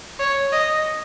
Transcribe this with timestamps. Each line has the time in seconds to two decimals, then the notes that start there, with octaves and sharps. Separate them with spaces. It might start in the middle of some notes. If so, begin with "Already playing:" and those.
0.19 C#5
0.53 D#5